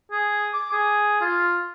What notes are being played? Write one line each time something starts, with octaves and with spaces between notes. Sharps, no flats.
G#4
D6
G#4
F4